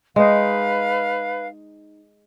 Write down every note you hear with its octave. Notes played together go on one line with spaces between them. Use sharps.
G#3 D#4 B4 F5